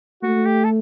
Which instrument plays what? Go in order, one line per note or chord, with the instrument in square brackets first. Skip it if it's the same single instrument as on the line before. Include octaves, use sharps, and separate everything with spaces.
[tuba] A3 [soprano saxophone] F#4
[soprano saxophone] G4
A4